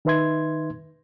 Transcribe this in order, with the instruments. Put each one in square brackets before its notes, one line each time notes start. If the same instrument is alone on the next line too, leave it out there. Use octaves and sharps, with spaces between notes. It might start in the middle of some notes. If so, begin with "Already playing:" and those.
[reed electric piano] D#3 D#4 B4 E5 C6 G#6